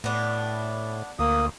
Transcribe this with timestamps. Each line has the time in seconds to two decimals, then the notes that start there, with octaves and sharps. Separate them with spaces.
0.04 A2 B3 D4
1.19 D2 A#3 D#6